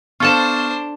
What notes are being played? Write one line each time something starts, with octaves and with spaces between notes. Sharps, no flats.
B3 D4 F4 A4 C5 A5 C#6 F6